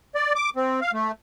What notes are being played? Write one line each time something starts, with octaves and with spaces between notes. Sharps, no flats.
D5
D6
C4
F5
A3